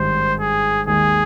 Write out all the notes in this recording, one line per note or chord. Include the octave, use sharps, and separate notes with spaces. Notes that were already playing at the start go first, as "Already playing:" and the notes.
Already playing: G#1 G2 D#3 C5
G#4
D#2 D#3 G#3 G#4